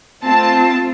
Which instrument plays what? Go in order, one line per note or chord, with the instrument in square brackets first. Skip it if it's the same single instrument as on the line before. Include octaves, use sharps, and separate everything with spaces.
[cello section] A3 C4 F4 [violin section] A5